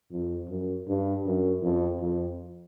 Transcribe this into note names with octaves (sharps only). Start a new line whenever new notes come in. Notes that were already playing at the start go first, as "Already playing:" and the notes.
F2
F#2
G2
F#2
F2
F2